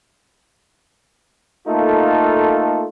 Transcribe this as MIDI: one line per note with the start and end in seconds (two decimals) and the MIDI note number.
1.68 2.85 57
1.68 2.85 58
1.68 2.85 63
1.68 2.85 65
1.68 2.85 69